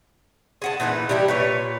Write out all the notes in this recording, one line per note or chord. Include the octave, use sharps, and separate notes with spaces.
G#4 F#5 A5
A#2 E3 D#4 B4
G3 D4 E4 G4
A#2 B4 C#5